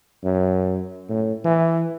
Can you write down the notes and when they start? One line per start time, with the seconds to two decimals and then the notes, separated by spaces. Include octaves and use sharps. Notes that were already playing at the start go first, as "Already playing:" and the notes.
0.24 F#2
1.09 A2
1.44 E3